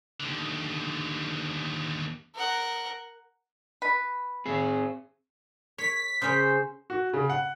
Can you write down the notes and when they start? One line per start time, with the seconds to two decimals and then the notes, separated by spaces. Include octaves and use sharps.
0.20 D#2 D3
2.35 A#4 F#5
3.82 B4
4.46 C4 G#4
5.78 C#5 B6
6.22 C#3 C#4 C5
6.90 F#4
7.13 C#3
7.30 F#5